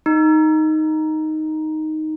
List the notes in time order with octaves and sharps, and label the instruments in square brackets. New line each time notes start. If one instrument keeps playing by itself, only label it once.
[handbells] D#4